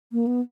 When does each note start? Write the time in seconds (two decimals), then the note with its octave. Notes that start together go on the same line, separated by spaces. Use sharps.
0.12 A#3
0.27 B3